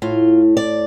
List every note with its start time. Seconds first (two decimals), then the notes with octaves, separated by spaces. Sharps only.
0.02 A2 F4
0.57 D5